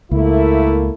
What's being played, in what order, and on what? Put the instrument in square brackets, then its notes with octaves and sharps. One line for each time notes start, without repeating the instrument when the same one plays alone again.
[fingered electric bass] C#2 [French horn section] A3 A#3 E4